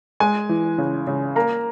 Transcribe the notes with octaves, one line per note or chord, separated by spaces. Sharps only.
G#3 G#5
E3
C#3
C#3
A#3 A#5